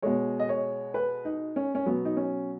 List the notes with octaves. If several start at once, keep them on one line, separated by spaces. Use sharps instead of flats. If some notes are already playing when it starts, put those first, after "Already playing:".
B2 G#3 C#5
D#5
C#5
B4
D#4
C#4
C#4
B2 F#3 B3
D#4
C#4